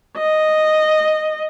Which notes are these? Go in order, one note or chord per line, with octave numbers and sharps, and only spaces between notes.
D#5